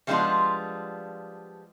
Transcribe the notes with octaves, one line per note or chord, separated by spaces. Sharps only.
F3 G3 G#3 B3 D4 F4